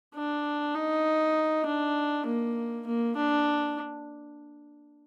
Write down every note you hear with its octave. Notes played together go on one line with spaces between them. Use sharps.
D4
D#4
D4
A#3
A#3
D4